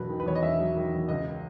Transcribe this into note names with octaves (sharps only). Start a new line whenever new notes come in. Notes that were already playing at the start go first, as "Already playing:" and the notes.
Already playing: E1 F#3 B4
D#3
B4
E2 C#5
D#5
E1 E5
F#3
D#3
E2
C#2 D#5